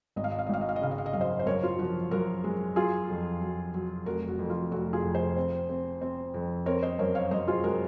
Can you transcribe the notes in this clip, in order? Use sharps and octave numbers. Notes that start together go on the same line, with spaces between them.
G#1 D#5
F5
D#5
F5
D#5
G#1 F5
D#5
F5
D#5
C#3 F5
D#5
F5
D#5
F#2 F5
C5 D#5
C5
F#2 A#4 C#5
F4
F3 F#4
F#2 F#4 A#4
G#3
F#3 F4 G#4
F2
F#3
F#3
F1 F#4 A#4
F#4
F2
F4
F1 F#4
F4 G#4
F2
G#4 C5
C4
C4
C4
F2
C4 A#4 C#5
C5 D#5
F#2 A#4 C#5
C#5 F5
F#2 C5 D#5
F4 G#4
G#3 F#4 A#4